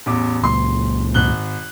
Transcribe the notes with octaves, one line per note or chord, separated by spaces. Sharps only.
A1 E2 D6
C#2 A#2 C6
G#1 F#6 G7